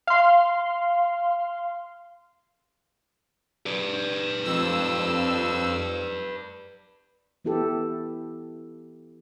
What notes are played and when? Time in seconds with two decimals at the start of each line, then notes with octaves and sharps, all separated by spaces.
0.07 F5 C6
3.66 B4 D5
4.44 F2 E6
7.45 E3 B3 E4 G4 A4